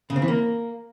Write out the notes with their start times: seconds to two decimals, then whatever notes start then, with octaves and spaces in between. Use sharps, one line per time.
0.10 C#3
0.16 C4
0.22 E3
0.28 A#3